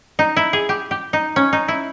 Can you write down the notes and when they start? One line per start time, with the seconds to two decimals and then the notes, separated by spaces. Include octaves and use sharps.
0.19 D#4
0.37 E4
0.53 G#4
0.69 G4
0.91 G4
1.13 D#4
1.36 C#4
1.53 D#4
1.68 E4